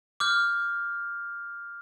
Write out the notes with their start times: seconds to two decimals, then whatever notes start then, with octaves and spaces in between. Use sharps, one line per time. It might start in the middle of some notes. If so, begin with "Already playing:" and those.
0.20 D6 F6 G6